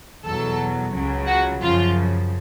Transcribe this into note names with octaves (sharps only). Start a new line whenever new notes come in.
E2 B2 F#3 A4
C#2 C#3 F#3
F#4
F#2 C#3 F3 F4